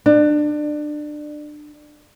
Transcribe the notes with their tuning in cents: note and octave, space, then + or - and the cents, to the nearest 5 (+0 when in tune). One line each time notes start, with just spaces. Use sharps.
D4 +25